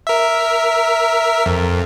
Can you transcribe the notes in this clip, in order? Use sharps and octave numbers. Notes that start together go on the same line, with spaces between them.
A#4 E5
F2